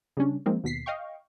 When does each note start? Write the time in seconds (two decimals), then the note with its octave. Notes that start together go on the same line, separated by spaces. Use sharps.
0.17 C#3 G3 C#4 D4
0.46 F3 G#3 A#3 C4 D#4
0.64 D#2 B2 B6 C7
0.86 D#5 F5 G5 C#6